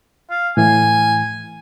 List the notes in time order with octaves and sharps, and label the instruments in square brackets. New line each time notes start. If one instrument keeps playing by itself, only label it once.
[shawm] F5
[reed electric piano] A2 E3 [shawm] G#5